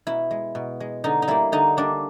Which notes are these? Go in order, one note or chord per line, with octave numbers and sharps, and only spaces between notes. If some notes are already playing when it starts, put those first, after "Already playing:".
B2 E4
G#3
B2
G#3
D3 D#4
D#4
G3 A#3 E4
D3 D#4
G3 A#3 D4